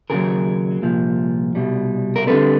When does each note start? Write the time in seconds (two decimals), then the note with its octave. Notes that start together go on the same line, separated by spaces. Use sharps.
0.10 D#2 C#3 F#3 G#4 A#4
0.82 C2 A#2 F3
1.55 C2 B2 G3
2.16 A#4
2.27 D3 G3 C4 A4 B4